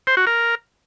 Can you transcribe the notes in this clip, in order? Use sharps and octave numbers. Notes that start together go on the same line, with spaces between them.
C5
F#4
A#4